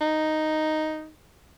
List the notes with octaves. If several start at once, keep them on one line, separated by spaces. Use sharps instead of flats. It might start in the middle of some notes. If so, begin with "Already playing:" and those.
D#4